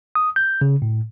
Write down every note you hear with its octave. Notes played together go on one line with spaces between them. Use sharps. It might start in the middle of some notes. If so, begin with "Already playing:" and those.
D#6
G6
C#3
A2